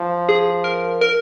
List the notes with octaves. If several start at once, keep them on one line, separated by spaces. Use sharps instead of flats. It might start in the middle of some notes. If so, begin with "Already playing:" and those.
Already playing: F3
G#4
A#4
A#4